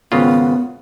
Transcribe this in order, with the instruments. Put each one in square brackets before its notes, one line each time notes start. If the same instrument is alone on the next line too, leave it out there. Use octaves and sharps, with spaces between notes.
[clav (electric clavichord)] G#1 C#3 F4 [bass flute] B3